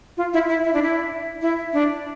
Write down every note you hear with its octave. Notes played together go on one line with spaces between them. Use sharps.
F4
E4
E4
E4
D4
E4
E4
D4